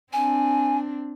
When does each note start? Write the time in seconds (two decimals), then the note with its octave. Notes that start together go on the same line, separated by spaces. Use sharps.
0.13 C4 D4 G#5